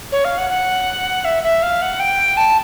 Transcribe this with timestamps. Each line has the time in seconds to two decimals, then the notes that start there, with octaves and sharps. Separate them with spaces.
0.12 C#5
0.24 F5
0.37 F#5
0.50 F#5
1.24 E5
1.43 E5
1.62 F5
1.82 F#5
1.99 G5
2.37 A5